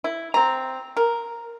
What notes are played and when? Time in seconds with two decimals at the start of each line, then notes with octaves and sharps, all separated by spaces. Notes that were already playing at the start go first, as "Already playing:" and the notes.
0.04 E4
0.34 C4 A#5
0.97 A#4